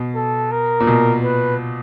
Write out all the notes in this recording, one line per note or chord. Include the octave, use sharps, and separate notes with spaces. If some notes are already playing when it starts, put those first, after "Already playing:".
Already playing: B2
A4
A#4
A#2
B2
B4